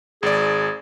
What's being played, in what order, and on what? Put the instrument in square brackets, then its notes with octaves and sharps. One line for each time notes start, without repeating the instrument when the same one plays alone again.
[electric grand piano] G#1 D5 [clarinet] G#4